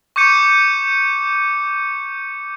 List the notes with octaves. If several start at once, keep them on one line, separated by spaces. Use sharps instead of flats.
C#6 D6 G6 C#7 D#7